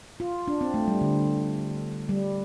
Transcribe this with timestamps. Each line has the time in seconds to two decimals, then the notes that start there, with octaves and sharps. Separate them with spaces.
0.20 F4
0.48 D4
0.61 C4
0.74 A3
0.88 G3
1.01 D3
2.09 G3